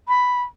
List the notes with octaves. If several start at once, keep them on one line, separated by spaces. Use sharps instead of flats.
B5